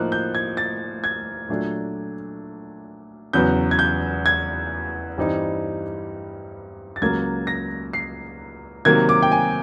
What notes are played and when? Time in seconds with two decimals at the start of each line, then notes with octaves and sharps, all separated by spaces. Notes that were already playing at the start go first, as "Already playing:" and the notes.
Already playing: A2 F3 A#3 D#4 F#6
0.12 G6
0.35 G#6
0.57 A6
1.04 G#6
1.49 A#2 F#3 A3 D4
3.33 E2 C#3 F#3 B3 G6
3.71 G#6
3.79 G6
4.26 G#6
5.18 G2 E3 G3 C4 D#4
6.96 A6
7.01 C#2 C#3 F#3 A#3 G#6
7.47 A#6
7.93 C7
8.85 C3 D#3 F#3 A#3 G#6
9.09 D6
9.23 G5
9.32 G#5